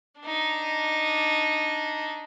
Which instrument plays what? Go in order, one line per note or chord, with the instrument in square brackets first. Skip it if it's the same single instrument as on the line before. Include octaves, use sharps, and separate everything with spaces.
[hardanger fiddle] D4 D#4